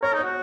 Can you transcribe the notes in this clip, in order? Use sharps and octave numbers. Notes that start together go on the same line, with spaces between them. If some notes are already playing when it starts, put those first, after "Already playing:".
A#4 C#5
D#4
F#4 C#5